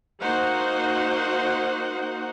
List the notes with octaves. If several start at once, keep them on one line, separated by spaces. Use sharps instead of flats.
A#3 D#4 F#4 C5 F#5